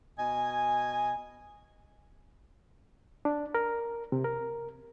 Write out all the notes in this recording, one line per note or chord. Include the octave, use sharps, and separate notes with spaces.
B2 D#5 G#5
D4
A#4
C3
A#4